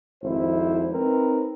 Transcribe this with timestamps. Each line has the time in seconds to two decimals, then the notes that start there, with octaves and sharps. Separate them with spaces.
0.23 G#1 F2 E4 C5
0.91 C4 D#4 A#4 B4